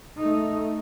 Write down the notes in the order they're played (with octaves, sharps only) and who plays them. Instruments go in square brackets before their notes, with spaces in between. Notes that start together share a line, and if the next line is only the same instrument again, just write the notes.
[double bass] A3 D#4